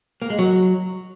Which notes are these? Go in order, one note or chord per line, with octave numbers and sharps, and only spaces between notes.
A#3
G#3
F#3